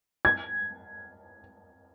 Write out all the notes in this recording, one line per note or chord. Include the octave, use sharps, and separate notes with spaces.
G#6